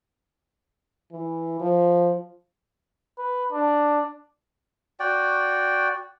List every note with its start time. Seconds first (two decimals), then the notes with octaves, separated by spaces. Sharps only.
1.12 E3
1.60 F3
3.18 B4
3.52 D4
5.00 F#4 D5 G5